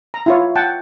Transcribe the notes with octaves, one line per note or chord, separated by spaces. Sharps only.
A#5
E4 F4 C#5
F#5 G5 A5